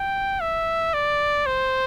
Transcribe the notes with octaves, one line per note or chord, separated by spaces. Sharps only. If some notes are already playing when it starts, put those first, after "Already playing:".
Already playing: G5
E5
D5
C5